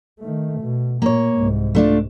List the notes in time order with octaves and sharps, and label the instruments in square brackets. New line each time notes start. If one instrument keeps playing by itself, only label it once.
[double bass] D#3 A3
B2
[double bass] A#2 [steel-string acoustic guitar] A#3 C#5
[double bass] C2 G#2
[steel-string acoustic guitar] A3 D4 F4